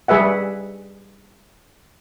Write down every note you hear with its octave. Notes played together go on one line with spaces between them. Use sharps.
G3 G#4 B4 E5 F#5